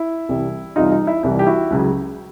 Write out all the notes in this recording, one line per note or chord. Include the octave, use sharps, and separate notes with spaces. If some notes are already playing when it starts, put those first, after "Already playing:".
Already playing: E4
C2 C3 E3 G3
C2 C3 E3 G3 D#4 F4
D#4
E4
C2 C3 E3 G3 E4
G4
E4 F#4
C#2 C#3 F#3